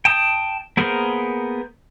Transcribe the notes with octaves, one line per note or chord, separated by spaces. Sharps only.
G5 A5 D#6
A#3 B3 G#4 A#4 C5